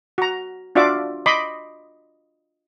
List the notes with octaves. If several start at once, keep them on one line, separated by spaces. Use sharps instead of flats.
F#4 A#5
D4 F4 F#4 D5 E5 D6
D#5 B5 C6 D6